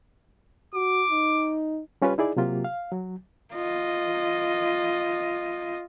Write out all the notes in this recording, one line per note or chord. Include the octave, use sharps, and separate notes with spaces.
F#4 D6
D#4
G3 C#4 F4 G4 B4 C#5
D#4 E4 G#4 D5
C3 F#3 A#3 F4 G4
F5
F#3
F4 D#5